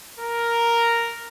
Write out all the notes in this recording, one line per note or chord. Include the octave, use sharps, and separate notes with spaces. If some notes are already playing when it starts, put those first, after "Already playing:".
A#4